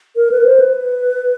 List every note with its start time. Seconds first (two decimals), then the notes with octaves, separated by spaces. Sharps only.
0.16 A#4
0.31 B4
0.45 C5
0.60 B4